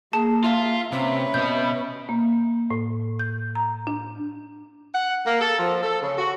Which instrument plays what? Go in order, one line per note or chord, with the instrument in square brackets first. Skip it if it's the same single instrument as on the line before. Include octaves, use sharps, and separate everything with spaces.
[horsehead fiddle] A#3 [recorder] G#4 [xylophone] A5
[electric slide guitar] F4 F5 [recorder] E5
[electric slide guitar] C3 [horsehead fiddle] C#4 B4 [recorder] E5
[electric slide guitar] B2 B3 [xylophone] G6
[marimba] A#3
A2
G6
A#5
D4
[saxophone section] F#5
A#3
A4
F3
A4
C#3
F#4